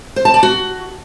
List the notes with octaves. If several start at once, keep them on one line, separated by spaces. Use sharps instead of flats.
C5
A5
D5
F#4